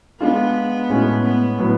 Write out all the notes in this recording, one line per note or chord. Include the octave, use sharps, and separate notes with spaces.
G#3 B3 D4 F4
A2 G#3 C#4 F#4
B3
A2 F#3 B3